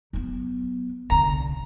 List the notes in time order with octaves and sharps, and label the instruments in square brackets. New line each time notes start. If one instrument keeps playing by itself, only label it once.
[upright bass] F#3 B3
[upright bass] C2 D3 [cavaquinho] A#5